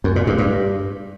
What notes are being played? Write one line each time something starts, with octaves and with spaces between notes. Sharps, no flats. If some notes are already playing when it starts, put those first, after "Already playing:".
F#2
A#2
G2
G2